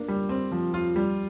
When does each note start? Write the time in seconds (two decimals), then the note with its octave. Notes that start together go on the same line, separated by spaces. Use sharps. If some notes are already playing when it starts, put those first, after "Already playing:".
Already playing: A#3 D4
0.08 G3
0.29 C4
0.52 F3
0.74 F4
0.96 G3